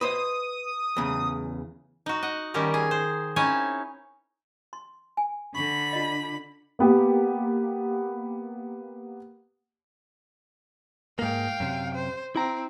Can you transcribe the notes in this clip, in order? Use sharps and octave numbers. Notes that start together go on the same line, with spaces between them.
B4 C5 D#5 D#6
E2 C#3
D#4 F#4
D#5 F#5
D#3 G3 C#4 G4 A#4
G#4
C5
C4 C#4 D#4 E4 C#5 G#5
C6
G#5
D3 D4 B5 C#6
F4 D#5
A#3 B3 G4
G#2 A#3 F5 G5
F#2 C3
C5
C4 E4 A#5